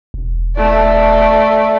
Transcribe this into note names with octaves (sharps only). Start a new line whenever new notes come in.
E1
A3 D5